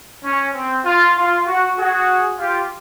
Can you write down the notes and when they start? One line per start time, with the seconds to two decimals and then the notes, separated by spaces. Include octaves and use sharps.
0.24 C#4
0.53 C4
0.85 F4
1.16 F4
1.46 F#4
1.76 F#4 G#4
2.38 F4 G4